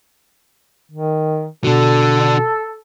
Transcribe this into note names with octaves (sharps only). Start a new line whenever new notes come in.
D#3
B2 D3 D4 F#4 A4